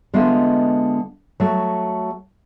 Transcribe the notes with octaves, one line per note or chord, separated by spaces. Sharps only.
D3 G#3 B3 F4 D#5 E5
F#3 A3 F#4